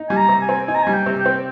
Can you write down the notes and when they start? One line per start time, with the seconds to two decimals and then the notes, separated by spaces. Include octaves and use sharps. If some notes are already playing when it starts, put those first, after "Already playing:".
Already playing: D#4
0.09 G3 G#5
0.17 A#5
0.29 C3
0.42 G#5
0.49 C4
0.67 D#4 G#5
0.75 A#5
0.83 G#5
0.87 G3
0.93 G5
1.06 C3
1.19 G5
1.26 C4